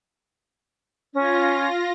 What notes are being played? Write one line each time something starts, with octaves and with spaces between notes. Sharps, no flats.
C#4 F4 A#6